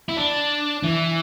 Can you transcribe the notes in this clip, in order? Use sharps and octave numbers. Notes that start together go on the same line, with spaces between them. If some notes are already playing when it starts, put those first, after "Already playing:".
E4
D4
E3